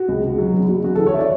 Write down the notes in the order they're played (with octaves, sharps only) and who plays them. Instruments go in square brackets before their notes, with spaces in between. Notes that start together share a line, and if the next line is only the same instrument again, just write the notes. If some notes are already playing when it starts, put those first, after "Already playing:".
Already playing: [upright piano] F#4
C#2
C#2
F#3
E2
F#1
C#3 F#4
A4
E3
C#5
E5
D5